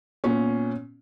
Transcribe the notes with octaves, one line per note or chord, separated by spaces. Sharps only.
A#2 B3 C#4